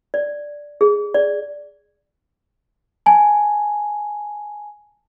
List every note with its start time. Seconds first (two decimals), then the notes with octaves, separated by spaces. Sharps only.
0.14 D5
0.81 G#4
1.14 D5
3.06 G#5 A5